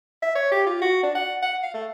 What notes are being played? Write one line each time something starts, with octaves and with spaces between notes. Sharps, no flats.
E5
C#5
G4
F4
F#4
D4
F#5
F#5
F5
A3